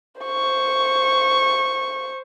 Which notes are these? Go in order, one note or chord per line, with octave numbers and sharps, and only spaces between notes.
C5 C#6